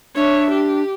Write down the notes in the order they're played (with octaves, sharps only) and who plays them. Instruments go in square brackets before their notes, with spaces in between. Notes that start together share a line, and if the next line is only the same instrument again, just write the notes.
[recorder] D4 [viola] C#5 E5
[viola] G4